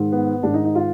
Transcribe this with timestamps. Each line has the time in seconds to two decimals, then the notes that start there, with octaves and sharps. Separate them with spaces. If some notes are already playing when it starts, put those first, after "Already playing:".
Already playing: G#2 D#3
0.12 B3
0.43 G#2 D#3 D4
0.54 D#4
0.65 D#4
0.75 F4